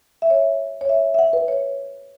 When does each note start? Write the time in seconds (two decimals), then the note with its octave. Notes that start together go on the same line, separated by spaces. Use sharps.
0.22 E5
0.30 C#5
0.81 C#5
0.89 E5
1.14 E5
1.19 F#5
1.33 B4
1.48 C#5